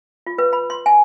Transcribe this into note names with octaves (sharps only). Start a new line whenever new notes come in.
F4
B4
B5
C6
G#5